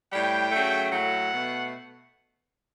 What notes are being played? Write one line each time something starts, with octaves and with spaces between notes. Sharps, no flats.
A2 G3 G5
C#3 F#3 A3
A2 F#3 A3 F#5
B2 A3